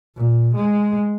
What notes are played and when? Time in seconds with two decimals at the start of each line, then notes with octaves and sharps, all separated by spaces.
0.16 A#2
0.56 G#3